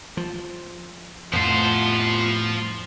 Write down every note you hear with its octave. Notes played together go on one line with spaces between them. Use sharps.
F3
F2 A2 F3 B3 F4 C5